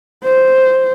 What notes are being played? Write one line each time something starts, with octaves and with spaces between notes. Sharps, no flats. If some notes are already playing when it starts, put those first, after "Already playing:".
C5